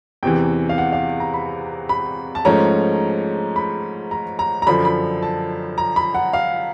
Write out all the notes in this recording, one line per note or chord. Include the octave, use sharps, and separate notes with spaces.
E2 C3 E3 G5
F5
F#5
F5
A#5
B5
B5
A5
G#2 F3 A3 C#4 A#5
B5
A#5
A#5
A#5
F#2 D3 F3 B5
B5
A5
A#5
B5
F#5
F5